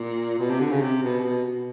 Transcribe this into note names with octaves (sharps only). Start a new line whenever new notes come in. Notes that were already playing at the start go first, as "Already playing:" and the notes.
Already playing: A#2
B2
C3
D3
C#3
C3
B2
C3
B2
B2